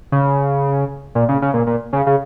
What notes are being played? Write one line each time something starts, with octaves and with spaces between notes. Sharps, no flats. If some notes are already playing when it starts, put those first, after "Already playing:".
C#3
A#2
C#3
C#3
A#2
A#2
C#3
C#3